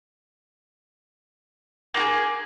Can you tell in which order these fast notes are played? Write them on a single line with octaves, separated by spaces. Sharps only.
A#3 F#4 G#4